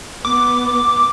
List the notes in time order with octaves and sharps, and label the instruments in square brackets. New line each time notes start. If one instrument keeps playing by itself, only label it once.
[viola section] B3 [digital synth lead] D6